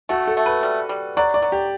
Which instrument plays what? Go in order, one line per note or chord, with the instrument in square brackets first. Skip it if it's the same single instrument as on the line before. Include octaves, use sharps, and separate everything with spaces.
[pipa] A3 [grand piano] F#4
[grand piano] A4
[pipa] A3
[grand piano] B4
[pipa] G3
G3
[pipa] F#3 [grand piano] D5
[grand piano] D5
[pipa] F#3
[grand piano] G4